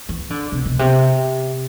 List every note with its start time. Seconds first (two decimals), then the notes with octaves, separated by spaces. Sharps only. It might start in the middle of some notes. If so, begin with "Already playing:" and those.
0.09 E3
0.30 D3
0.52 C3
0.66 B2
0.79 C3